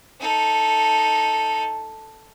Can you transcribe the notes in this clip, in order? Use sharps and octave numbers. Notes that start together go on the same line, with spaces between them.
D#4 A4